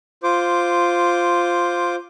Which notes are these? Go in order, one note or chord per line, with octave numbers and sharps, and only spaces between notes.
F4 C5 D6